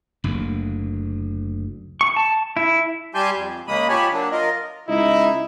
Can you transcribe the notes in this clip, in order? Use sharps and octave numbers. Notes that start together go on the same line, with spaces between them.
F#1 D2
C#6
A5
E4
G3 G4 G#5 A5 C6 G6
F2
C#3 G#3 A#3 B5 D#6
F3 G4 C#5 G#5 A5 B5
F#3 A#3 D4
F4 A#4 D#5
C#2 D#4 E4